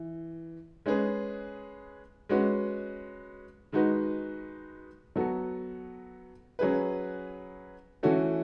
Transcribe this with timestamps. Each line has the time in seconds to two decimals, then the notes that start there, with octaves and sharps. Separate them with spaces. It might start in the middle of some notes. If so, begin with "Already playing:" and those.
Already playing: E3
0.86 G#3 C#4 G#4 B4
2.29 G#3 C#4 F#4 B4
3.72 D#3 G#3 D#4 F#4 B4
5.16 F#3 B3 F#4 A4
6.59 F#3 C#4 G#4 B4
8.03 E3 A3 C#4 F#4 A4